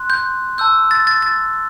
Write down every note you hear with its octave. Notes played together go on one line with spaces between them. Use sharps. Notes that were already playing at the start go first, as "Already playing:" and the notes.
Already playing: C6 F#6
G6
A5 E6 G6
A6
A6
A6